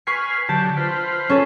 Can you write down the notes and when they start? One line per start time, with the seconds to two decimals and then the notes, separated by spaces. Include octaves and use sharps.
0.07 B4 G#5 C#6 F6 B6 C7
0.49 D3 F#3 G4 A5
0.77 F4 B4 C5
1.29 C#4 A4